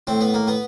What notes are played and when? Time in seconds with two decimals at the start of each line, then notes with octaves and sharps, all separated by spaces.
0.07 A2 C4
0.21 B3
0.34 A#3
0.47 B3